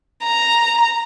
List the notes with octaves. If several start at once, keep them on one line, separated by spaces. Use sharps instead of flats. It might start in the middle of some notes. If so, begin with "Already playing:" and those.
A#5